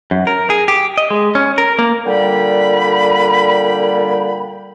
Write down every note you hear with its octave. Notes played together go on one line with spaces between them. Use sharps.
F#2
A#4
G#4
G4
D#5
G#3
C#4
A#4
A#3
A#2 D3 G3 G5 B5